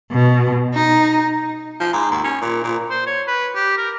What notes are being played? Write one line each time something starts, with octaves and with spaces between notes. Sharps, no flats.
B2
D#4
F3
G#2
D#2
C#4
A#2
A#2
C5
C#5
B4
G4
A#4